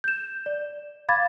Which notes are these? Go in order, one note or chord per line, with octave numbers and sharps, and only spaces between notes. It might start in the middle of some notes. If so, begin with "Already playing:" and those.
G6 E7
D5
F5 B5 D6 G#6 A6